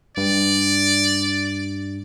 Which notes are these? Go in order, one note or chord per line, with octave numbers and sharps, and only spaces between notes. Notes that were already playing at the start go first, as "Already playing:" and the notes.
G2 D5